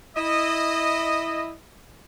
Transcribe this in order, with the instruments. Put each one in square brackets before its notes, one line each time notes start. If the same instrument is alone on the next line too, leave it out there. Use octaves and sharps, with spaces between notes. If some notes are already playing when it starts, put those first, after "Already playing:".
[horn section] E4 D#5